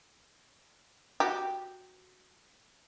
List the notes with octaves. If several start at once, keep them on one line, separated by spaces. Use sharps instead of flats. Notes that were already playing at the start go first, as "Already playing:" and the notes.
F#4 G4